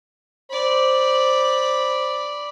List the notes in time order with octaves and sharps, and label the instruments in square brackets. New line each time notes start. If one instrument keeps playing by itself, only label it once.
[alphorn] C5 [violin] D5 B5